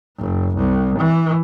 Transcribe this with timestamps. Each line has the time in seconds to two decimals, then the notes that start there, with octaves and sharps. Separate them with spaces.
0.18 F#1
0.56 C2
0.99 E3